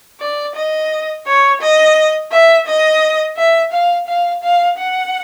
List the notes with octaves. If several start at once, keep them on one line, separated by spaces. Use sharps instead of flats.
D5
D#5
C#5
D#5
E5
D#5
E5
F5
F5
F5
F#5